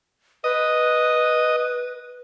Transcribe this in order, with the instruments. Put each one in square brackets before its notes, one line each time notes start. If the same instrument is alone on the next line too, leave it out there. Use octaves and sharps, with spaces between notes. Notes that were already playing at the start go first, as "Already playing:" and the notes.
[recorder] B4 [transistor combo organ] D#5